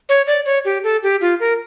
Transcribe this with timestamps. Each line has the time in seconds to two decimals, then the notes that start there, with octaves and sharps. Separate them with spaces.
0.09 C#5
0.27 D5
0.46 C#5
0.65 G4
0.84 A4
1.03 G4
1.21 F4
1.40 A#4